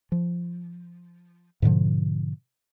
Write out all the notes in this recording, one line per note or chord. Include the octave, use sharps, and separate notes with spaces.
F3
G#2 B2 D3 F3